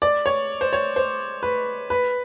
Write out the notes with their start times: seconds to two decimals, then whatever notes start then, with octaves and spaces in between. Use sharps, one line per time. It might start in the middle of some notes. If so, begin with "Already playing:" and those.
0.02 D5
0.26 C#5
0.61 C5
0.73 C#5
0.96 C5
1.43 B4
1.90 B4